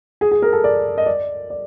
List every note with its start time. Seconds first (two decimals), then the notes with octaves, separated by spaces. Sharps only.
0.21 G#4
0.31 G#4
0.42 A#4
0.53 A4
0.64 D5
0.98 D#5
1.06 D5
1.50 D5